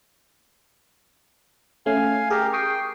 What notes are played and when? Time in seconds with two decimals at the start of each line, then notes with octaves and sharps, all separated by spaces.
1.86 A3 C#4 F5 G#5
2.30 G4 G#4 A#4
2.53 G5 C#6 D#6 C7